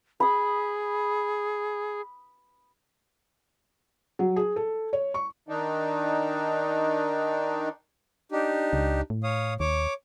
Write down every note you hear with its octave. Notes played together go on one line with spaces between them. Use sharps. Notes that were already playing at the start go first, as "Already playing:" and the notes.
G#4 B5 D#6
F#3
G#4
A4
C#5
C#6
D#3 D4 D#4
D4 D#4 G4
C#2
A2
C#5 F5 D#6
D#2 C#5 D6